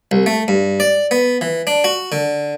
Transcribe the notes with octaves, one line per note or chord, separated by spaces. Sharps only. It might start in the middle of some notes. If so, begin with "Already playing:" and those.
C2
A3
G2
D5
B3
E3
D4
F#4
D3